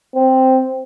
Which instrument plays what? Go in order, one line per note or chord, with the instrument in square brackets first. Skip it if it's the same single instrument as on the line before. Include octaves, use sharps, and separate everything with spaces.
[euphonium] C4